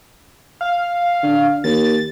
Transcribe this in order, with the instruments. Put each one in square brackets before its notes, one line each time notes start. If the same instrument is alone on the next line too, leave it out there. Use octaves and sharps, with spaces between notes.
[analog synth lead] F5
[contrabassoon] D3
[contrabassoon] D#2 [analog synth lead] A6